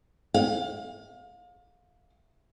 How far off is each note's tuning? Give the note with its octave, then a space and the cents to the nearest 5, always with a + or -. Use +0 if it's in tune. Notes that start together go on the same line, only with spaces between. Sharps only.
F5 +30